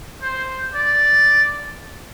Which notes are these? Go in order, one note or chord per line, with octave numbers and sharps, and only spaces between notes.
C5
D5